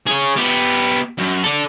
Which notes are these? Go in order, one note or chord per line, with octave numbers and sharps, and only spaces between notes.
G#4 C#5
B3 G4
F#2
A4 D5